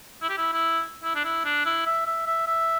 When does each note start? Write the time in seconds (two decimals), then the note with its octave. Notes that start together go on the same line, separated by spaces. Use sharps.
0.22 E4
0.29 G4
0.37 E4
0.53 E4
1.04 E4
1.15 D4
1.24 E4
1.44 D4
1.65 E4
1.86 E5
2.06 E5
2.26 E5
2.47 E5